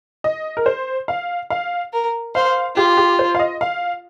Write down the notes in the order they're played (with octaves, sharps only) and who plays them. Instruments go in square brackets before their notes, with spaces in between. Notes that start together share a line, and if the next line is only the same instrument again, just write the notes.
[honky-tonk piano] D#5
A#4
C5
F5
F5
[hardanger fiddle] A#4
[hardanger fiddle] C5 [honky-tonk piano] F5
[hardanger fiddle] F4 [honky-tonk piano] G4
[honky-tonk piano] G4
C5
F5
D#5
F5